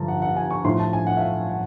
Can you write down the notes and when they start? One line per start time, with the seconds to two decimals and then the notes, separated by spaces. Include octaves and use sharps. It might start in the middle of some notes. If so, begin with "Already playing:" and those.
Already playing: G2 D3 F3 A5 A#5
0.08 F#5
0.22 F#5
0.37 G#5
0.50 C#6
0.64 A2 F3 C6
0.79 A5
0.93 G#5
1.07 F#5
1.17 E5
1.21 F5
1.49 F#5